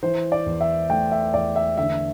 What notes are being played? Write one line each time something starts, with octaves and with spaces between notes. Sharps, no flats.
E3 C5
D5
E2
E5
A3 G5
E5
E2 D5
E5
D3 E5